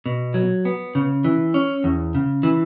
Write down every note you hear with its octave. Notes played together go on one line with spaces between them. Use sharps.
B2
F#3
B3
C#3
E3
C#4
E2
C#3
E3